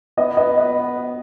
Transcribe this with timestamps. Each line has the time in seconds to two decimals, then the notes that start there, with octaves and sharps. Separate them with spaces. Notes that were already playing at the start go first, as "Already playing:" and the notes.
0.18 B3 B4 D#5
0.37 B4 D#5
0.57 B4 D#5